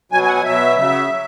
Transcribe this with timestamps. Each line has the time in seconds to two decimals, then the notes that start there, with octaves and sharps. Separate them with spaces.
0.12 B2 F#3 G#5
0.23 G#5
0.28 F#5
0.33 G#5
0.44 B2 F#3 E5
0.77 C#3 F#3 E5
1.10 F#3